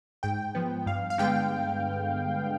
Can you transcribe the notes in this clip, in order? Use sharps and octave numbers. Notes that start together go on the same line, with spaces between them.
G#2 G5
F3 B3
G2 F5
F5
D3 G#3 B3 G5